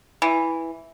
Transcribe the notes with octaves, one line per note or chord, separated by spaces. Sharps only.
E3